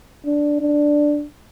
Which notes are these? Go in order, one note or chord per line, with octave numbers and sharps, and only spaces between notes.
D4
D4